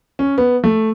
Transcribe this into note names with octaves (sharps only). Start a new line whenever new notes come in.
C#4
B3
A3